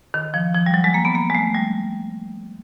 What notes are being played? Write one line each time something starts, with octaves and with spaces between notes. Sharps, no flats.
D#3
F3
F3
G3
F#3
G#3
A#3
B3
A#3
G#3
A3
G3